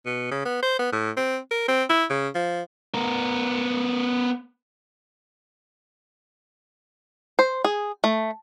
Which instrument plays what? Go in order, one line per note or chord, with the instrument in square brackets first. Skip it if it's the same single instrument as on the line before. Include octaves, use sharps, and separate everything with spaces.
[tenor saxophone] B2
C#3
B3
C5
B3
A2
C4
A#4
C4
E4
C#3
F3
[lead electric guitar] B3 A#4
[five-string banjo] C5
G#4
A3